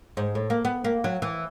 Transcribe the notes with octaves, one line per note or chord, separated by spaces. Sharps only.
G#2
A2
A#3
B3
A#3
F#3
E3